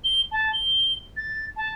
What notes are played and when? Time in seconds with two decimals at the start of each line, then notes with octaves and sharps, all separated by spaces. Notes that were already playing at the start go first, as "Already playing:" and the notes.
0.04 G7
0.32 A5
0.53 G7
1.17 A6
1.57 A5